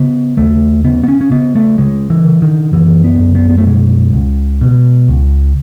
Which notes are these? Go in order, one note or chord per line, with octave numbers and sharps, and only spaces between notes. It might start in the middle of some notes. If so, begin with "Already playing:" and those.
Already playing: C#3 B3
D#2 A3
C#3 B3
B3
C#4
C#4
C#3 B3
A3
C#3 G#3
E3
C#3
D#3
F#2 E3
B3
F#2
B3
B3
A3
B2 G#3
C#2
B2
C#2